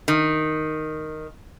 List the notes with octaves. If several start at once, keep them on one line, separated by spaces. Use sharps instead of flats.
D#3